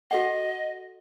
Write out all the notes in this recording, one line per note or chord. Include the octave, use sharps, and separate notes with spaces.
F#4 A4 D#5 F#5